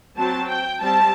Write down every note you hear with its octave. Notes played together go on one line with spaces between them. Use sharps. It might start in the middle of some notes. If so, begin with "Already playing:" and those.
F#3 C4 A5
G5
G3 C4 A5